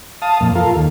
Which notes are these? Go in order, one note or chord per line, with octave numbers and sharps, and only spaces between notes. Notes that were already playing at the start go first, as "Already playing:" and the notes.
F5 A5 D#6
F2 A#2
F4 A4 A#4 F5
D#2